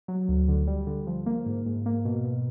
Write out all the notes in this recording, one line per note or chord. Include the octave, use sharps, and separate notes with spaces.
F#3
D2
D3
G3
D3
F3
A#3
G#2
G#2
A#3
B2
B2